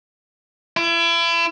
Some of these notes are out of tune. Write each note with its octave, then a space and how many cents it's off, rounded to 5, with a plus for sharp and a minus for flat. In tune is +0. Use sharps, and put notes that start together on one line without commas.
E4 +35